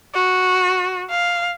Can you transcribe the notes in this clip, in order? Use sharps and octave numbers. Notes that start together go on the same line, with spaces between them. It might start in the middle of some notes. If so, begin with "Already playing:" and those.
F#4
F5